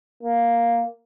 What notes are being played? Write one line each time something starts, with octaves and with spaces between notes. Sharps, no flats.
A#3